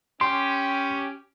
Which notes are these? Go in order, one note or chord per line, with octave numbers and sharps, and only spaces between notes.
C#4 G4 C6